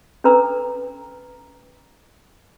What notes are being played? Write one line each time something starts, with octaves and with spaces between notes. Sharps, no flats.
C#4 D4 A4 B4 A#5 E6